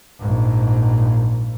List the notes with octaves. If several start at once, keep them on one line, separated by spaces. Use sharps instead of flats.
A#1 G#2